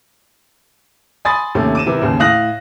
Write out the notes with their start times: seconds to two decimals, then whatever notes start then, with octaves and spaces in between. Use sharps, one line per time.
1.25 G#5 B5 C6 D#6 A6
1.55 D#2 C3 A3 C#4
1.75 D6 D#7 E7
1.86 C3 E3 A#4
2.01 D#2 C#3
2.20 A2 F5 D#6 F#6 A#6 F#7